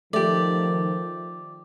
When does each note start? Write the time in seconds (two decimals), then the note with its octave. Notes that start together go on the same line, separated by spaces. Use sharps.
0.13 D#3 F3 A3 G4 D5